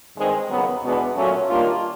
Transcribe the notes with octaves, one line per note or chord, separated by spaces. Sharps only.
G2 D#3 G#3 C4
D#2 C#3 F#3 B3
E2 B2 G#3 B3 D4
A#2 F#3 A3 C#4
D#3 G3 A#3 D4 F4